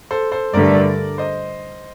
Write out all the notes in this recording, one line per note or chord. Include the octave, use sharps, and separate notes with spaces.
A4 C5
A4 C5
G2 D3 A3 A#4 D5
C5 D#5